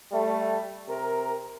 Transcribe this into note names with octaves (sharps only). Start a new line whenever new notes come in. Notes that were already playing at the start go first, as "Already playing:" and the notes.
G3 A3
C3 A#4